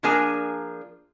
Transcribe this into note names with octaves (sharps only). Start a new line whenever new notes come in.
F3 A#3 D4 G#4 A#4 G#5